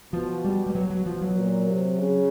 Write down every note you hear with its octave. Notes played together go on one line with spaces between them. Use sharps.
B2 F3
G3
G3
B2 F#3
F#3
F3
F#3
A#2
C3
C#3